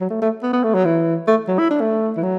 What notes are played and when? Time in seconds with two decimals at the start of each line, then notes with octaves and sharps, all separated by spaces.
0.01 F#3
0.10 A3
0.22 A3
0.43 B3
0.53 B3
0.64 A3
0.74 F#3
0.85 E3
1.27 A3
1.48 F#3
1.59 E4
1.70 D4
1.81 A3
2.17 E3
2.23 F#3